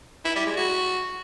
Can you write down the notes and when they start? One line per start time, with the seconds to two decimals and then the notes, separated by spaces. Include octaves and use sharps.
0.25 E4
0.35 G3
0.46 G#3
0.57 F#4